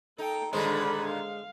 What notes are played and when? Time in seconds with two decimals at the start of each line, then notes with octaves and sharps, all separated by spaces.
0.18 D#4 A4 G5
0.53 G2 A#2 D3 D#3 G#3 C5 C#5 B5
1.07 F5